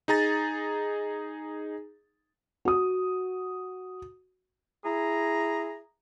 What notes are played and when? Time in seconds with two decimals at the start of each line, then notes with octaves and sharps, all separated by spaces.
0.08 D#4 G#4 A#5 A6
2.65 F#4 D#6
4.85 E4 G#4 A#5